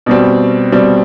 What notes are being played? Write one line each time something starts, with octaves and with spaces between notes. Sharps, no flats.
B2 G3 C4
B2 G3 C4